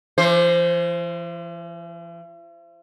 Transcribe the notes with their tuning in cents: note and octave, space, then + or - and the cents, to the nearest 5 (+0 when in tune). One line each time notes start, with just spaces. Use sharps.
E3 +45 C5 +0